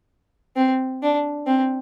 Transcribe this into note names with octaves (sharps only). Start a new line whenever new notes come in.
C4
D4
C4